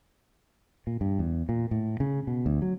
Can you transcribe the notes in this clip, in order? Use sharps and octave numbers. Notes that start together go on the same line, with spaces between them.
A#2
G2
E2
A#2
A2
C#3
B2
D2
F#3